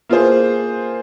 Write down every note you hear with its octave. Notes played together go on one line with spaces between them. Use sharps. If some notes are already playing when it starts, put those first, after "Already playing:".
A#3 F4 G#4 C5